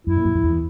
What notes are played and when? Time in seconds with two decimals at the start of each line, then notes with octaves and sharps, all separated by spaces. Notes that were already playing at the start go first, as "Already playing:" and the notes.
0.07 F#2 E4
0.16 A#2
0.25 F#2
0.35 F2
0.44 E2